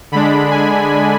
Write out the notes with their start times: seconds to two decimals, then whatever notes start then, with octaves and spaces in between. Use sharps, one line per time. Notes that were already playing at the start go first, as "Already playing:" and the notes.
0.12 D3 G#3 D4 B5
0.51 G#5